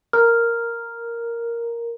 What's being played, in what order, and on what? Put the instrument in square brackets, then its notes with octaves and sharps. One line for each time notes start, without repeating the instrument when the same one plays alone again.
[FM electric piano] A#4 [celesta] F6